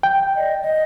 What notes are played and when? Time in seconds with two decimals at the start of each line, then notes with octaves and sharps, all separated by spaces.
0.03 G5
0.36 D5 D#5
0.62 D#5